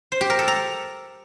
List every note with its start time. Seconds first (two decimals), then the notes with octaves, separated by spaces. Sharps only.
0.12 C5
0.21 G4
0.30 A#4
0.39 A4
0.48 A#5